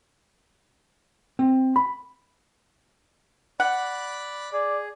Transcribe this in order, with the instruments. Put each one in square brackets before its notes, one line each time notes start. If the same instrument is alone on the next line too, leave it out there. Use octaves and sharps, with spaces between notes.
[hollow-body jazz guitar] C4
B5
[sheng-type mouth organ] D5 B5 F#6 [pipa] F#5
[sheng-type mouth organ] G#4 [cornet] D5